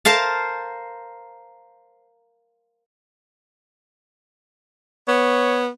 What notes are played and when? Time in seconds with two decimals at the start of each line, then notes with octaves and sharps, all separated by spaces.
0.05 A#4 C5 F5 A5
5.08 B3 C#5